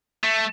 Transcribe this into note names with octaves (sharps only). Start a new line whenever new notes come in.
A3